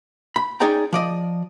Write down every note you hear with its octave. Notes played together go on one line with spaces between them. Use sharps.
B5
C#4 D#4 G#4 D5 G5 A#5
F3 D5 D#5